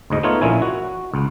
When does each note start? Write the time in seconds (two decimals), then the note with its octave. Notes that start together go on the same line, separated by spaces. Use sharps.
0.10 D2 G#2 D#5
0.23 A3 B3 D#4 F4 C#5
0.41 A#1 A#2 C#4 E4 G#5
0.62 F#4
1.14 C#2